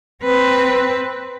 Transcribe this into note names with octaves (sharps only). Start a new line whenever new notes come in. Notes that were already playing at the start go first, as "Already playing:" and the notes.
C4 B4